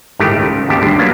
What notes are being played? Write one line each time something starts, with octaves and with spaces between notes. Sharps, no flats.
G1 A2 D#3 G#3 A3 G4
C#2
G#1 D#2 C#3 G4 A5
G1 D2 G2
F#3 A#3 B3